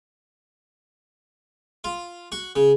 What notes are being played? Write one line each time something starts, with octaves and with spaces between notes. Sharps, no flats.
F4
F#4
C#3